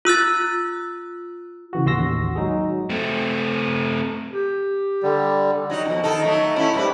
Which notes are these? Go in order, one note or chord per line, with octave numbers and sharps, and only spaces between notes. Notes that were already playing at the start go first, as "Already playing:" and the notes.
F4 E6 F#6 A6
C#3 E3 F#4
A1 D#2 F#4 C6 E6 A#6
F#3 G#3 D#4 F#4 G#4
A3 C4
G4
D3 G3
F#3 D#4
F2 B2
D#3 D#4 A4
F#3 A3 D#4
A3 C#4 E4
G#2 G3 B4